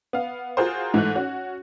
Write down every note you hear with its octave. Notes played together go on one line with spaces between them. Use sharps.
B3 F5
F4 F#4 G#4 A#4 C5
G#2 E3 A3 F#6
C#4 F#4